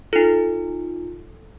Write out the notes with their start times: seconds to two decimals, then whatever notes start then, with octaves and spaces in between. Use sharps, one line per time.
0.13 D#4 F4 A4